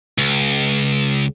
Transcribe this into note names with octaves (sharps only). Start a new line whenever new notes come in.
C#2